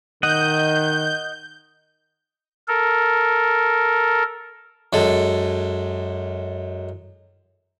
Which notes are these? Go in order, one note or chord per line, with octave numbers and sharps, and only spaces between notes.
D#3 D#5 F#5 G6
A4 A#4
F#2 G#3 A4